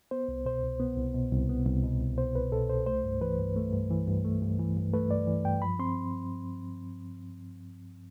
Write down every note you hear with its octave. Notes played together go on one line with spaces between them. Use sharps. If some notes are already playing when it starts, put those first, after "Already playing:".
B3 C5
C2
B2 C5
C2
B3
C2
B2
C2
B3
C2
B2
C2
B3 C5
C2 B4
B2 A4
C2 C5
A3 C5
G2
E3 B4
G2
A3
G2
E3
G2
A3
G2
E3
G2
A3 B4
G2 D5
E3
G2 G5
F3 B5
C4 C6